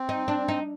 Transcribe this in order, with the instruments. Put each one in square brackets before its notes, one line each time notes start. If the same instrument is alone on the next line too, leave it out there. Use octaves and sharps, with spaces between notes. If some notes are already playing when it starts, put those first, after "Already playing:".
Already playing: [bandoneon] C4
[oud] D#4
D4
D#4